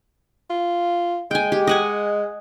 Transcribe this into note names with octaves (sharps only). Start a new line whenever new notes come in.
F4
G#3 G5 G#5
G4
D#5 F#5 G#5